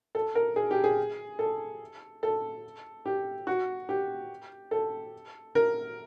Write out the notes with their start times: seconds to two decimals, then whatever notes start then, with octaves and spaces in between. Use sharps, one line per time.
0.15 A4
0.35 A#4
0.56 G#4
0.71 G4
0.84 G#4
1.39 A4
2.23 A4
3.06 G4
3.47 F#4
3.89 G4
4.71 A4
5.55 A#4